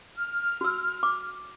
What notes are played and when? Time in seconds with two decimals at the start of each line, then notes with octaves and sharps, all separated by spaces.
0.17 F6
0.61 F#4 E6
1.03 D6